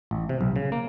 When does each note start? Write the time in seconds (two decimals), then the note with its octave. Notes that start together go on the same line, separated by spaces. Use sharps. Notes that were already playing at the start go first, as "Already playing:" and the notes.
0.11 A1
0.29 C3
0.41 B1
0.56 C#3
0.72 A#3